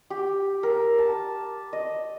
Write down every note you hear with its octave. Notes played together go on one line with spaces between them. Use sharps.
G4
A#4
A5
D#5